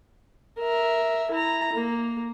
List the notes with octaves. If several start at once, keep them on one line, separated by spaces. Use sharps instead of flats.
A#4 E5
E4 A#5
A#3